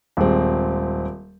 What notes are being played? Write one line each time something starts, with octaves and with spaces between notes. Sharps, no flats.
D#1 G#3 C4